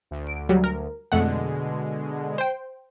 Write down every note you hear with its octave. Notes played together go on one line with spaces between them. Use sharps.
D2
D7
F#3 G3
A#4
F2 B2 D3 G#3 A3 F#5
C5 G5